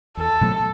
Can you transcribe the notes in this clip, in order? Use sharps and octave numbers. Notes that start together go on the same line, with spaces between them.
E2 A4
B2 F#3 A3